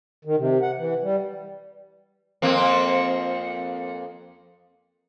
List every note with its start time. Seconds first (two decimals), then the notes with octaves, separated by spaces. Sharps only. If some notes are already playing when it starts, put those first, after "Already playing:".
0.25 D#3
0.37 C3
0.62 F#5
0.78 E3
1.02 G3
2.42 F2 A#3 C4